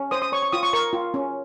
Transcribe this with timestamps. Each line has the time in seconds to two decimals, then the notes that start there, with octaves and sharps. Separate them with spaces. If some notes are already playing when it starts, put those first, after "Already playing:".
Already playing: C#4
0.11 C5 D#6
0.22 D#6
0.32 C#5 C#6
0.42 C#6
0.53 F4 D#6
0.63 C#6
0.73 A#4 C#6
0.93 F4
1.14 C#4